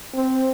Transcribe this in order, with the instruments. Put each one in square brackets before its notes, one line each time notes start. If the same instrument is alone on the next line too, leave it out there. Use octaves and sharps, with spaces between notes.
[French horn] C4